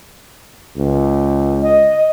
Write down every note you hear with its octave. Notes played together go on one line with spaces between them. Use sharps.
C#2
D#5